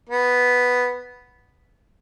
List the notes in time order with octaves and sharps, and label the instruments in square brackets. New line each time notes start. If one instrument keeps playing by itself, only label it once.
[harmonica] B3